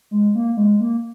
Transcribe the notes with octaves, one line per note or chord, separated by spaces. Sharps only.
G#3
A#3
G#3
A#3